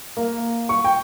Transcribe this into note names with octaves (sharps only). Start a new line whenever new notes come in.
A#3
C#6
G5